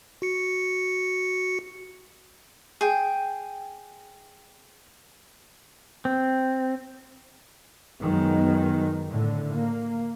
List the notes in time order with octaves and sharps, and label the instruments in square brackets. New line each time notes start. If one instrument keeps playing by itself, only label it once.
[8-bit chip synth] F#4 C#7
[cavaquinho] G#4 G5
[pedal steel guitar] C4
[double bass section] F#2 D#3 F#3 G#3 B3
A2 D3
A#3